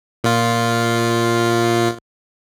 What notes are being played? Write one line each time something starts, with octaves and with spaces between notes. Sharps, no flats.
A#2 F4